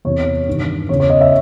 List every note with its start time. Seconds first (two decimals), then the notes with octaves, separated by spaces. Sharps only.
0.05 E2 C3 E3 C#5
0.47 G2 D#3
0.89 E2 C#3 E3 C#5
1.00 C#5
1.10 D#5
1.21 E5